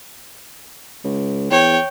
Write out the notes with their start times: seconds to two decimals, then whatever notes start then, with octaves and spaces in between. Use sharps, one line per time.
1.04 C#2
1.51 E2 C#5 G5